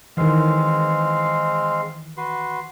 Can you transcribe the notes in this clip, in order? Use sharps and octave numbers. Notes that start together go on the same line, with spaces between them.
D#3 E3 G#3 C4 F5
F#4 B4 C6